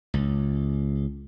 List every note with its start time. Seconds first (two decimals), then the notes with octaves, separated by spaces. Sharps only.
0.14 C#2